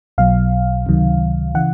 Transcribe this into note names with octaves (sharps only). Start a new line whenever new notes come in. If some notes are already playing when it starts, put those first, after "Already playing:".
B1 B2 F#3 F5
C#2 C3 D#3 F#3
C#3 E3 F#5